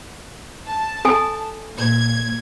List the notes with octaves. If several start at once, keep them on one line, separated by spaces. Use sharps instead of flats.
A5
A4 G#5
A#2 G#6